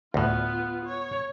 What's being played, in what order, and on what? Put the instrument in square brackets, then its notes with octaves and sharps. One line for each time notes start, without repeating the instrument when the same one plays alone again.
[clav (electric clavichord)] D2 A2 [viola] B3 F4
[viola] C#5